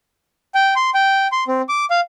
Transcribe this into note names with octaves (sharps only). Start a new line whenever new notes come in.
G5
C6
G5
C6
C4
D6
F5